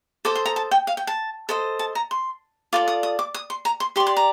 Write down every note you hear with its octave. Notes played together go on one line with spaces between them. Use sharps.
A4 C5 D#5 D6
C6
A#5
A5
G5
F5
G5
A5
A4 C5 D#5
A5
A#5
C6
F4 A4 D5 D6
D#6
D#6
D6
D#6
C6
A#5
C6
G4 D5 C6
C6
A#5